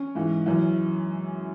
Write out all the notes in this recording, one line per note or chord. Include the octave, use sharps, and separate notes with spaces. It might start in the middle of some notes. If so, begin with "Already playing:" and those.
Already playing: C#4
G#2 E3
F#2 E3